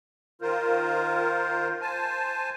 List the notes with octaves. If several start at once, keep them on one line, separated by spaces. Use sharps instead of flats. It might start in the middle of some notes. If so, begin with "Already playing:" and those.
D#3 F4 A#4 C5
C5 G#5 A5